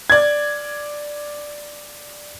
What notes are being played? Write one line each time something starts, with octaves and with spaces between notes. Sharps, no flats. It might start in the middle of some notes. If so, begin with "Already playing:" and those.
D5 G#6